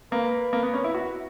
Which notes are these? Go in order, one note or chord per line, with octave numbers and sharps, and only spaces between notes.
A#3 B4
A#3
B3
C#4
E4
F#4